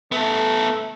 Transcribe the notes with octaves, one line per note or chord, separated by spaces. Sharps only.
A3 B3 A4